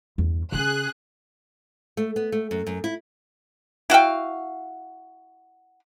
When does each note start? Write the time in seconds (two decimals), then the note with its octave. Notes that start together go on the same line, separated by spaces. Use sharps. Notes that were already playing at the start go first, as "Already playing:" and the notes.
0.18 E2 G2
0.52 C#3 C#4 G#4 F#6
1.97 A3
2.16 B3
2.32 A3
2.51 F#2
2.66 F#2
2.84 E4
3.90 E4 F#4 F5 G5